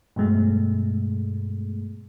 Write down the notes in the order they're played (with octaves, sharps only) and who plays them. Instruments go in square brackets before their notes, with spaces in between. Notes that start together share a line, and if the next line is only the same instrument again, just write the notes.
[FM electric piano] G2 B2 G#3 A3